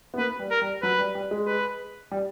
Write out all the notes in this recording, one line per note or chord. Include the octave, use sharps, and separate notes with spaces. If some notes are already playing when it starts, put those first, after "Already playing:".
B3
A#3 B4
G3
A#4
G3
F#3 B4
G3
G3
G#3
B4
G3